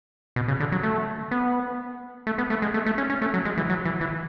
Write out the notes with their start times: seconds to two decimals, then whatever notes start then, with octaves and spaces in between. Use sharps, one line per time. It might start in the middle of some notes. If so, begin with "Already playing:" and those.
0.36 B2
0.48 C#3
0.60 D3
0.72 F#3
0.83 A3
1.31 B3
2.27 A3
2.38 B3
2.50 A3
2.62 G#3
2.74 A3
2.86 A3
2.98 C#4
3.10 C#4
3.22 A3
3.34 F#3
3.45 G#3
3.58 E3
3.70 F#3
3.85 E3
4.01 E3